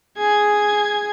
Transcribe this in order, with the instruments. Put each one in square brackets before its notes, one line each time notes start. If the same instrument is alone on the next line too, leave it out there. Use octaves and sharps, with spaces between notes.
[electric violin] G#4 G#6